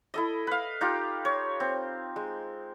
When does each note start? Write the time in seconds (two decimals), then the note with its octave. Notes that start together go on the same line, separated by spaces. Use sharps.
0.14 E4 A4 D#5
0.47 B4 F5
0.81 D#4 F4 G4
1.25 C#5
1.60 C4
2.16 G#3